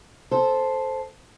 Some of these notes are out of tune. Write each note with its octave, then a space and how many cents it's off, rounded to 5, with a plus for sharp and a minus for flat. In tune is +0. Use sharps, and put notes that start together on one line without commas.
A4 -10 C5 +0